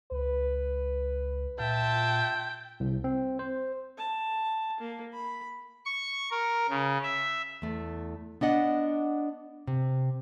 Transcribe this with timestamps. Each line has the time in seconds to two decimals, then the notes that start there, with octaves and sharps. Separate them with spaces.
0.11 C#2 B4
1.60 A#2 F4 E5 G5 A5
2.80 C2
3.04 C4
3.39 C5
3.98 A5
4.80 A#3
5.13 B5
5.85 C#6
6.31 A#4
6.69 C#3
7.03 E5
7.62 E2 A3
8.41 B3 D4 D#5 F#5
9.67 C3